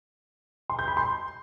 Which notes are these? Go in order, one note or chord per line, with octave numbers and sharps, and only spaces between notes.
C6
G6
B5
C6